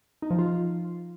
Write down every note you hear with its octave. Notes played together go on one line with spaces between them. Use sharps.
D#4
F3
F4